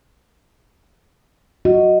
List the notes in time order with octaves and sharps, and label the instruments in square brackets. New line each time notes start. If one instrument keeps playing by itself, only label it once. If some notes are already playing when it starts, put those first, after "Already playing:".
[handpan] F#4 [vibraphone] D#5